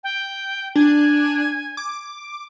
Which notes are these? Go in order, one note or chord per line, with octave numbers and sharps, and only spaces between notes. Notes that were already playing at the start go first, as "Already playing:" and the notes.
G5
D4 G#5
D6